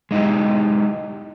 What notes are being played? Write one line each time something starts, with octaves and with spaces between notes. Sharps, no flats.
G#3 D#4 E4 G4